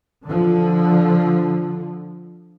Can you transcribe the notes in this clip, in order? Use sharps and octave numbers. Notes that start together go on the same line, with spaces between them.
D3 F3